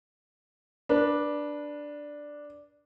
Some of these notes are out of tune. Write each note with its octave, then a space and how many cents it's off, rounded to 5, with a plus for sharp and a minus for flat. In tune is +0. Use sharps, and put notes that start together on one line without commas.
D4 +0 B4 -20